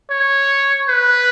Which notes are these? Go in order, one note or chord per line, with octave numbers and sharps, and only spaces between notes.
C#5
B4